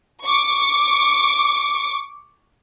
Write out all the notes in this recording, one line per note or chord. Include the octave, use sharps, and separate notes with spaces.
C#6 D6